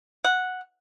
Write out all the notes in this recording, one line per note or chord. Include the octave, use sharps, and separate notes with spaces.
F#5